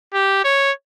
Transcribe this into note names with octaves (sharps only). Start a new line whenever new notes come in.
G4
C#5